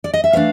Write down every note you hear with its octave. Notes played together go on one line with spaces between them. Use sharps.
D5
D#5
E5
E3 A3 D4 F5